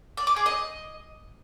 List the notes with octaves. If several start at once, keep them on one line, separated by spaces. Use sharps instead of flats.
D5
D6
G#4
D#5